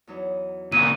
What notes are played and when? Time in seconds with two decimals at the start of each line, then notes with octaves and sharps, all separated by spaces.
0.07 E2 F#3 D#4
0.72 A#2 C#3 D#7